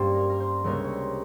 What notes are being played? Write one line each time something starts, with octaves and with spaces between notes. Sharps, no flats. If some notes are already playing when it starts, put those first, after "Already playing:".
Already playing: G2 G3 A#3 C#4 C5
A#4
A#4
C5
C#2 C3 G3 A#3 C#4 A#4 C#5
C#5
C5